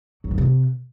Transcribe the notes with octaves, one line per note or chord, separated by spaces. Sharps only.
F#3
G#2
C3